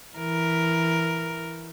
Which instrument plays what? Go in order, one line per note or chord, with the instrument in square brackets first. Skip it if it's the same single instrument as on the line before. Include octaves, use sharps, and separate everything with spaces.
[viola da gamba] E3 A#4